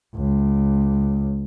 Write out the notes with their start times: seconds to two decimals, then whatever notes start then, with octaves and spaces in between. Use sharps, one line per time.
0.16 C#2